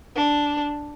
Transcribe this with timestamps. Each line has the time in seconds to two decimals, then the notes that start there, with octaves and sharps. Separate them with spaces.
0.15 D4